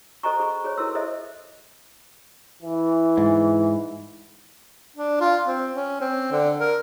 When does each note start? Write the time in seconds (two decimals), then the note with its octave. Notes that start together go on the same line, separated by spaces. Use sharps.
0.23 A4 C5 D#5 G#5 A#5 C#6
0.40 G#4 B5 C#6
0.64 G#4 C5 C#5
0.78 E4 A4 A#4 C#5 C6 E6
0.95 G#4 A4 C5 D#5 E5
2.63 E3
3.18 G#2
4.96 D4
5.21 F4
5.47 C4
5.75 C#4
6.01 C4
6.32 D3
6.61 A#4